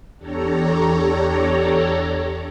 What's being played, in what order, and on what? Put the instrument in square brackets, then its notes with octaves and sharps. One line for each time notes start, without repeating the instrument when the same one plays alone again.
[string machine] E2 D4 G4 A4 C#5 A#5